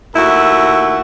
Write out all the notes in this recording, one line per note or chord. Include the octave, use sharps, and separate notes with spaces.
D#2 A3 E4 F#4